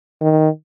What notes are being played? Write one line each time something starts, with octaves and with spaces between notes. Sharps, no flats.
D#3